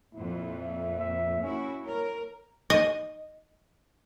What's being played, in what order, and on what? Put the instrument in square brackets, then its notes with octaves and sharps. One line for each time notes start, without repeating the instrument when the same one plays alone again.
[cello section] F2 A#2 [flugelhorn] E4
[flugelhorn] E5
E5
[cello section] A#3 E4 F#4 [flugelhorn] C#4
[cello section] A#4 [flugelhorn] C#5
[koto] D#5